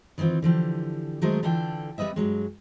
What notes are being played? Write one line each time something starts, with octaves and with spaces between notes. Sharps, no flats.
D#3 E3 A#3 C4 F4
D3 E3 F3 G4
D#3 F#3 G#3 A3 A#4 C5
D3 E3 F4 A4 D5 G5
G3 B3 B4 D#5 E5
G2 D#3 F#3 G#3